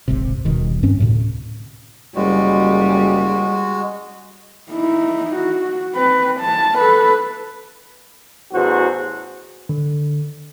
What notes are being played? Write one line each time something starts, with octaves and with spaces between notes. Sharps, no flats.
D1 G#1 C3
D#1 B2 D#3
G2 C4 C#4
D2 A2 C3
F#1 G3 G#3 F#4
D#4 E4
F#4
C4 B4
A5
A4 B4
A1 E2 F#4 C5
D3